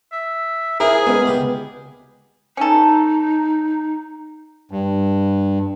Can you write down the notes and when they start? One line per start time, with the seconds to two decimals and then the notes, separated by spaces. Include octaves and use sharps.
0.12 E5
0.80 E4 G#4 A#4 C5 E5
1.07 G#3 B3 C#4
1.26 C#2 G4 B5
2.57 C#4 D#4 A4
4.71 G2